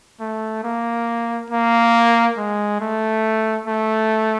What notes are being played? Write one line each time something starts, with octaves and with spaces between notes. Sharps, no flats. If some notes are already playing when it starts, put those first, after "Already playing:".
A3
A#3
A#3
G#3
A3
A3